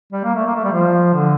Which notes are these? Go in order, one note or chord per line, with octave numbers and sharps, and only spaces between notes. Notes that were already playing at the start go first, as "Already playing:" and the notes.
G3
A#3
A3
A#3
A3
G3
F3
D3